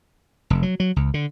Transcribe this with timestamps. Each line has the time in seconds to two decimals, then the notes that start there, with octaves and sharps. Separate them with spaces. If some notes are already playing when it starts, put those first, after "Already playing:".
0.50 F1
0.63 F#3
0.80 F#3
0.96 C#2
1.14 D3